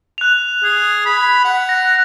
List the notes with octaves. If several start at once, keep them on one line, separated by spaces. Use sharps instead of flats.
F#6 F7
G#4
B5
F#5
A#6